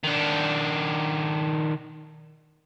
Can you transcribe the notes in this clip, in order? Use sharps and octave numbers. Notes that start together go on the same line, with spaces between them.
D#3 D4